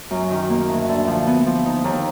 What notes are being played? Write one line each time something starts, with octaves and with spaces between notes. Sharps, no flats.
F#2
D#3
A#3
D2
D3
F3
B3
F3
D#4
D#2